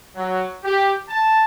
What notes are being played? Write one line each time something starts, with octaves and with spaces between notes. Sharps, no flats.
F#3
G4
A5